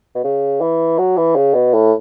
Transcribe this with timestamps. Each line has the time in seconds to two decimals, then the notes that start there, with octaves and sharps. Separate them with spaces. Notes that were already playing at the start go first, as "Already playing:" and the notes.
0.15 B2
0.24 C#3
0.61 E3
0.98 F#3
1.17 E3
1.36 C#3
1.54 B2
1.73 A2